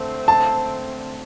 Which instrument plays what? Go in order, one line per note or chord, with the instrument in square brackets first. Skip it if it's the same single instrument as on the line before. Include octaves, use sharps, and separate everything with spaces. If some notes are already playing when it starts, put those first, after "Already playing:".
Already playing: [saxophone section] D3 A3 C4
[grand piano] A5